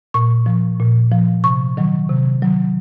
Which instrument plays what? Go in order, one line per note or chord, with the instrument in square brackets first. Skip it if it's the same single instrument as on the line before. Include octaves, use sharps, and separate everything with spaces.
[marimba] A#2 C#6
F3
A#2
F3
C3 C#6
D#3 F#3
C3
D#3 F#3